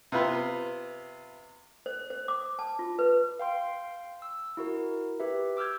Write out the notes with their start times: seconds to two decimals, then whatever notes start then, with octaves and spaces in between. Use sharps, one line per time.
0.12 C3 B3 F4 B4
1.86 C5
2.10 C5
2.28 D6
2.59 A5
2.79 F4
2.99 B4
3.39 F5 G5 C6
4.22 E6
4.57 E4 F#4 A#4
5.20 G4 B4 E5
5.57 D6 E6 F6 G6 G#6